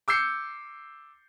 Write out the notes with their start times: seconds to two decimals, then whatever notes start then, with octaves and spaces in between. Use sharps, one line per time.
0.08 D6 E6 G6 C7 C#7